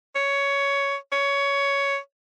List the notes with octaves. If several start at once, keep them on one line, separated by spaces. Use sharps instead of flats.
C#5
C#5